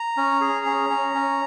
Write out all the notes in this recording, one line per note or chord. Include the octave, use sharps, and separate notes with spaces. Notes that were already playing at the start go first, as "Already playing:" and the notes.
Already playing: A#5
C#4
G#4
C#4
C#4
C#4